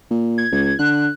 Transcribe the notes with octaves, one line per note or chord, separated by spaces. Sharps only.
A#2
G#6
C#2
D3 F#6